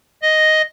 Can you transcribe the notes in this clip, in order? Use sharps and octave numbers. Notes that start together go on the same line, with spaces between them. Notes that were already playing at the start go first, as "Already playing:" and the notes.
D#5